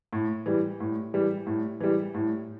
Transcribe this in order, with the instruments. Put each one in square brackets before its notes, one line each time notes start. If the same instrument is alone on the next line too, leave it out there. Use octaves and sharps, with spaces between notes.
[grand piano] A2
E3 G3
A2
E3 G3
A2
E3 G3
A2